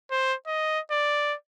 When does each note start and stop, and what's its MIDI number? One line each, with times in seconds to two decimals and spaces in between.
0.11 0.35 72
0.47 0.80 75
0.91 1.35 74